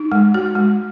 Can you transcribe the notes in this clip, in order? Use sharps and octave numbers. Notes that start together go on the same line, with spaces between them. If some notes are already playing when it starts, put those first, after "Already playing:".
Already playing: D#4
G#3
F#4
G#3